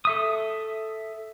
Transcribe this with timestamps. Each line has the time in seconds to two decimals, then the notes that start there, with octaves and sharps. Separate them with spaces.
0.05 A4 E5 D#6